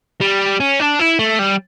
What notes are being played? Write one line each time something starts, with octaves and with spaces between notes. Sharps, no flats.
G3
C#4
D4
E4
A3
G3